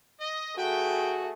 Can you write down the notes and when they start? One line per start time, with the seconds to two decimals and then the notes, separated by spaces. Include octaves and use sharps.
0.19 D#5
0.58 A3 F#4 G#4 B4 G5